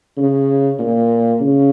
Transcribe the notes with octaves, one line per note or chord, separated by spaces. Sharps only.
C#3
A#2
C#3